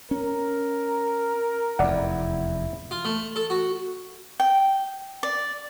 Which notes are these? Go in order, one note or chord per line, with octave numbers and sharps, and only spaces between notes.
C#4 A#4
F1 E2 E4 D5 F#5
F4
A3
A4
F#4
G5
D5